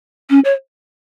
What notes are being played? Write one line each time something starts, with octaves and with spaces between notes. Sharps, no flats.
C#4
C#5